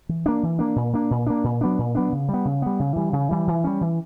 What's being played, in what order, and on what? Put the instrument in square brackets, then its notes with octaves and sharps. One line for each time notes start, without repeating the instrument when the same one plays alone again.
[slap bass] E3
A#3 D4
E3
A#3 D4
A#2
A#3 D4
A#2
A#3 D4
A#2
F#3 B3 D4
A#2
F#3 B3 D4
C#3
G3 B3
C#3
G3 B3
C#3
E3 G3
C#3
E3 G3
E3
G3 C#4
E3